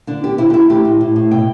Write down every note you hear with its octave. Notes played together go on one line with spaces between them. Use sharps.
D3 D4
B3 G4
D3 E4
G4
D3 E4
A3 G4
A2
A2
A2
B2 G5